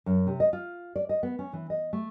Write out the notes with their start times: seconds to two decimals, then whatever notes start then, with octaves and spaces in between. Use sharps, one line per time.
0.06 F#2
0.27 C3
0.40 D#5
0.53 F4
0.96 D5
1.09 D#5
1.23 B3
1.39 C#4
1.53 E3
1.70 D#5
1.93 A3